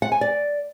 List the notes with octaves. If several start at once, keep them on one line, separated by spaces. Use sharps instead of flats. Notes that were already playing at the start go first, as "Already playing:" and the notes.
F#5
G#5
D5